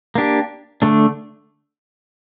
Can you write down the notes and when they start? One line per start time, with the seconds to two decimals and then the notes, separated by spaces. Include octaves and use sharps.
0.15 A#3 D4 G4
0.82 D3 A3 D4